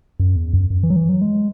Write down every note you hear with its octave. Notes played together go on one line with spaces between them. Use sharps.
F#2
E2
F#2
F#2
E3
F#3
E3
F#3
G#3